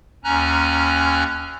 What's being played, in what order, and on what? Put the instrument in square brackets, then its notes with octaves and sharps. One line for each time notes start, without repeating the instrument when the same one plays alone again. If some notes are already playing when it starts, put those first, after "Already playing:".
[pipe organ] D#2 C#4 G#5 A#5 F#6